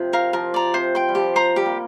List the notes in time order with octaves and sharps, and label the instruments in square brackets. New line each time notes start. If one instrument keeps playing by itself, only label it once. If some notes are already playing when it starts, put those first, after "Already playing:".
Already playing: [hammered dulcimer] C3 F3
[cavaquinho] A#4 F5
[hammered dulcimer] F3 [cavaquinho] A#4
[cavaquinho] D5 A#5
[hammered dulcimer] C3 [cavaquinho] C5
[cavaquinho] G5 C6
[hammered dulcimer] G3
[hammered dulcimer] F3 [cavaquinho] G4
[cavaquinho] C5 A#5
[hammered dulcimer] G3 [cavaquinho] G4
[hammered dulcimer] A#3